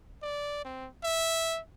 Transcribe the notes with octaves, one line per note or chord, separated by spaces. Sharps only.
D5
C4
E5